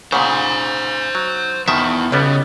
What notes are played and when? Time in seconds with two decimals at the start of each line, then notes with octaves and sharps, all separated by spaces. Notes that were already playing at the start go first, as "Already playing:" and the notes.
0.12 A#2 C#3 C5 F#5
1.15 F#3
1.68 E2 B2 D#3 E5
2.12 B1 C#3 G3 B3